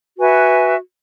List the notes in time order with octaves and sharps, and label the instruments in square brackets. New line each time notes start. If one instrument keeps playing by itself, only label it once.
[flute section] F#4 B4 E5 G#5